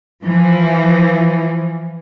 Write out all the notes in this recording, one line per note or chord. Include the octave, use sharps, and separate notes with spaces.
E3 F3